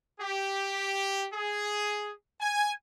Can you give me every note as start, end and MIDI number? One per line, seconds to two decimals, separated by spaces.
0.20 1.27 67
1.33 2.12 68
2.40 2.73 80